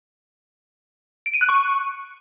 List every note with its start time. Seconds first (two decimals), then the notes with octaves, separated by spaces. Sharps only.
1.26 D7
1.34 D#7
1.41 F#6
1.49 C#6